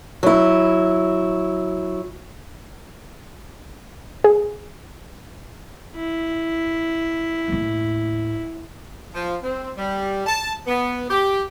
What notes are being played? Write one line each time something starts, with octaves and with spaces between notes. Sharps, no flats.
F#3 E4
G#4
E4
D#2 A2
F3
C4
G3
A5
B3
G4